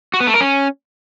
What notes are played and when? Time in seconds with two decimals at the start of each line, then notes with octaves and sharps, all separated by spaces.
0.14 F#4
0.20 B3
0.27 A3
0.34 A#4
0.41 C#4